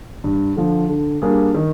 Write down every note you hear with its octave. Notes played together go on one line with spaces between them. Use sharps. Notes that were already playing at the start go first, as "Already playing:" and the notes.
G2
D3 F3
D3
G3 A#3 D4 G#4
D#3